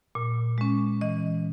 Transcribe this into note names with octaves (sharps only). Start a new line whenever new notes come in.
A#2
G#3 C#4
E3 D#5